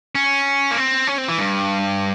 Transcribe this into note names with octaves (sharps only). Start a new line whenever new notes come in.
C#4
A#3
C4
C#4
C4
E3
G2